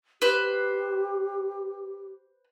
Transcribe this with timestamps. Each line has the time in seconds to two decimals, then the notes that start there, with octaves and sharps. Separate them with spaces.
0.22 G4 B4 C5